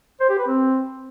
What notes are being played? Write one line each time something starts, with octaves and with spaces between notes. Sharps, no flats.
C5
G4
B4
C4